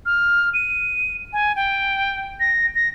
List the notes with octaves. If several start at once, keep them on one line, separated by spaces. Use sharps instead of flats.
F6
D#7
G#5
G5
A#6
A#6